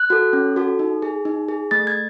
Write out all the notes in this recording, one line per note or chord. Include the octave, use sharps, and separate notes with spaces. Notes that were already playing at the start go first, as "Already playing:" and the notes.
Already playing: F#6
F#4 A4
C#4
F#4 A4
D#4
G#4
D#4
G#4
A3 A6
G#6